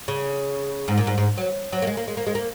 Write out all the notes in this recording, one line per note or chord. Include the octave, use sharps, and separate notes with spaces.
C#3
G#2
A#2
G#2
G#2
F#3
F#3
A#3
G#3
A#3
G#3
A#3
G#3
A#3